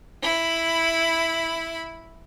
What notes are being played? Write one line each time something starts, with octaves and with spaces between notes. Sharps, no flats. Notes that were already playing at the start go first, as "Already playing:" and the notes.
E4 B5